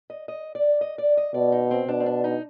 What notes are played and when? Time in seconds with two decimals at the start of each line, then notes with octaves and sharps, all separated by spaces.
0.10 D#5
0.28 D#5
0.55 D5
0.81 D#5
0.98 D5
1.17 D#5
1.34 B2 D5
1.52 D#4
1.71 C4
1.88 B2 D4
2.00 C4
2.06 D4
2.24 D#4